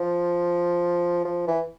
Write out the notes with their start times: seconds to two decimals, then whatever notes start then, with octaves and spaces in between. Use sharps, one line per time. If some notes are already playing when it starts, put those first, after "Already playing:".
Already playing: F3
1.25 F3
1.47 E3